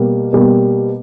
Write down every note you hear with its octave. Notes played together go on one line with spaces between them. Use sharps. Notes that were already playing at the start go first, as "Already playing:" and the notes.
Already playing: B2 G3 A#3
B2 G3 A#3